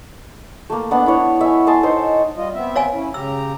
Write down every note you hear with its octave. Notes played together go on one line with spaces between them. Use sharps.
A3 A#3
B3 D4 F#5
E4 C#5
E5 G#5
G#5 A5 C6 D#6
D#4 C5 C#5
G3 F4 D#5
B3 C4 E5
C#5 F5 G#5
C#4 E4
C#3 G4 A#5 E6